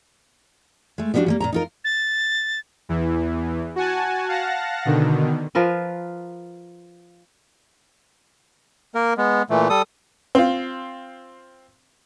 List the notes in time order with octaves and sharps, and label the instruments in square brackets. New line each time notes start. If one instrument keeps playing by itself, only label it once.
[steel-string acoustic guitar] G#3 A3
F3 G3 B3 C4 D4 F#4
G3 G#3 A#3
A#2 E3 A#5
D#4 F4 A#4
[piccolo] A6
[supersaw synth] E2 E3
F#4 F#5 G#5 A5
F5 F#5 A5 A#6
B2 D3 D#3
[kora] F3 F4 A#4 B4
[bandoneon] A#3 A#4
G#3 B3
A#2 E3 A3
G3 A4 D#6
[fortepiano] C4 F4